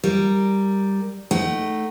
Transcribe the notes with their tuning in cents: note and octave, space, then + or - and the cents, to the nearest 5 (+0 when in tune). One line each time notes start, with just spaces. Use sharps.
G3 +0 A#4 +0
A3 +0 D#4 +0 F#5 +35